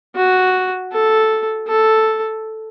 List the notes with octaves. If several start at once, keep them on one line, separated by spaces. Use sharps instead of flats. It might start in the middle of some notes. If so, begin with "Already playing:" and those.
F#4
A4
A4